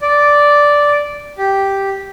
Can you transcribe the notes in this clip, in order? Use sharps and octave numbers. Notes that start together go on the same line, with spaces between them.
D5
G4